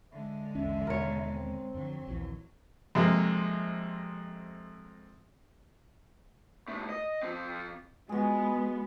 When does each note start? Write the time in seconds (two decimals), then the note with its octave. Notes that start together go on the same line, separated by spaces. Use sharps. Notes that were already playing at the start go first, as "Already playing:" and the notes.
0.12 D3 G#3 E5
0.55 A1 D#2 C#4 E5
0.87 D#2 B2 A#4 C#5
1.33 C4
1.74 F2 D3 F#3
2.08 A#1 D#2 E3
2.95 F2 C3 G#3 A#3
6.68 C2 A3
6.89 D#5
7.23 F3 C4
8.09 G#3 B3 F#4 G#4